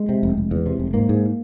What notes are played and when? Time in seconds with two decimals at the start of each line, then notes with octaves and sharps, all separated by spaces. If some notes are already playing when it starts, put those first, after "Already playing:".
Already playing: G#3
0.09 C3
0.23 F1
0.37 F1
0.51 E2
0.66 C3
0.80 F1
0.94 G#2 A#3
1.09 G#2